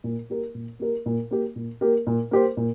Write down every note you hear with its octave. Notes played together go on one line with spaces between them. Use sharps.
A#2
A#3 G4 A#4
A#2
A#3 G4 A#4
A#2
A#3 G4 A#4
A#2
A#3 G4 A#4
A#2
A#3 G4 C5
A#2